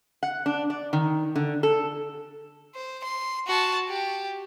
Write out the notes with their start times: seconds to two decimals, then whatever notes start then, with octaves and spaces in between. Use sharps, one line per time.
0.23 F#5
0.46 D4
0.70 D5
0.93 D#3
1.36 D3
1.63 A4
2.75 C5
3.03 C6
3.47 F#4 A5
3.88 G4